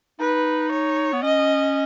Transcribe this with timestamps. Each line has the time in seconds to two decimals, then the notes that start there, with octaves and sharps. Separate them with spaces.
0.20 D#4 B4
0.72 C#5
1.13 B3
1.23 C#4 D#5